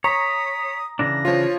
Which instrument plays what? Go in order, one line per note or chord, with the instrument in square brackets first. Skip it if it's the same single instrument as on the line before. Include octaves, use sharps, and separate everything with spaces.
[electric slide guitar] C#5 [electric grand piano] A#5 [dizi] D#6 [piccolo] B6
[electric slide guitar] C#3 E3 D4 [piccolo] A#6
[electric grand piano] F3 F4 [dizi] C#5